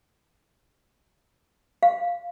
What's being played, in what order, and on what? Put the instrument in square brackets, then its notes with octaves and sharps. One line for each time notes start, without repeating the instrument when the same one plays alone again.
[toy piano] F5